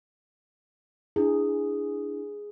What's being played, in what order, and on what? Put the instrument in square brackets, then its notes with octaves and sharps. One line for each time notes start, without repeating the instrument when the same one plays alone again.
[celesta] D4 E4 [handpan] G#4